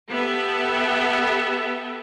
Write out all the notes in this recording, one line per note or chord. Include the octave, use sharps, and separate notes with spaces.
B3 G4 A4 E5